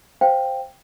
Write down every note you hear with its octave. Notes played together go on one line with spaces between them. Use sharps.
C5 F5 G5